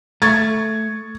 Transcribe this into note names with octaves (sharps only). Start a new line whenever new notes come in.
A3 C#6 G#6 A6